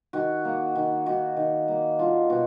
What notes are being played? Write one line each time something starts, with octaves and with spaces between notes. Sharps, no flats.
D#3 F#4
A#3
D#3
D#3 F#4
D#3
A#3
D4 F4
B2 F#4